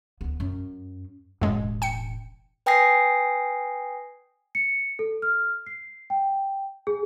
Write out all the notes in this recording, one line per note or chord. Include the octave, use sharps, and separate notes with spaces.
D2 B3
F#2
E1 A1 F#2 G#3
G5 C#7
B4 G5 G#5 D#6 A#6 C7
C#7
A4
F6
C7
G5
G#4